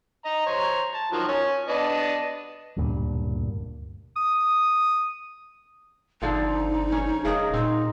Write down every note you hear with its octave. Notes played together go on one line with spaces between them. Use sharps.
D#5 A#5
C5 C#5 A#5
A5
D#3 F3 F#3
C#4 C#5
B3 D4 D#5
E1 D2 G2 A#2
D#6
G1 D3 F3 C4 D#4
C#4 C#5
E1 C#3 D#4 G#4 A#4
A#2 C4 D#4